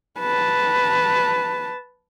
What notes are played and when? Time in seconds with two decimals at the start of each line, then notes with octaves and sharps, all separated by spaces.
0.20 B4 A5